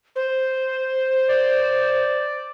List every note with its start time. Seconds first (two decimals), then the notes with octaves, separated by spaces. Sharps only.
0.16 C5
1.29 D5